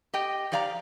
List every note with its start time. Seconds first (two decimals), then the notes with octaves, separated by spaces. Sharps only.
0.13 G4 D#5 G5
0.52 F3 G4 D5 F5 G5 A#5